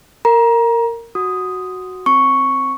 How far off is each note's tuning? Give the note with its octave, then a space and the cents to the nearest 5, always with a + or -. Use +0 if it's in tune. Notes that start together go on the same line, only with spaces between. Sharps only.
A#4 -15 A#5 +25
F#4 +0 D#6 +0
C4 +0 C#6 +0